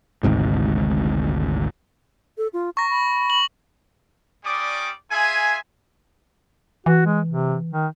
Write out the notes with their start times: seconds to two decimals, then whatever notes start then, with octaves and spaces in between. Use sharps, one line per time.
0.23 G#1 D2 G#2 C3
2.38 A4
2.53 F4
2.77 A#5 C#6 A#6
2.90 B5
3.30 F#7
4.44 G3 C#4 D5 D6 D#6
5.11 F4 G#4 E5 G#5
6.86 E3 F#4
7.05 G#3
7.29 C3
7.73 D#3